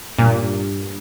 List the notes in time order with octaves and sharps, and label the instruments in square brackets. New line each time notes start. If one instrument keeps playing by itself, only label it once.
[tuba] G2 [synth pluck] A#2